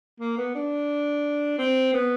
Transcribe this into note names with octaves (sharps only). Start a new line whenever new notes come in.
A#3
B3
D4
C4
B3